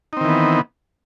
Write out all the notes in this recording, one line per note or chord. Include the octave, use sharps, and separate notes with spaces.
D#3 E3 B3 C4 D#4